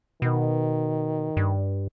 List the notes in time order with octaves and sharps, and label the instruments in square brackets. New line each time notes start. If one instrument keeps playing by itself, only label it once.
[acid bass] B2 [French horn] D#3
[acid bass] G2